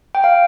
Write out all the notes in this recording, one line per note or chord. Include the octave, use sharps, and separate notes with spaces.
G5
F5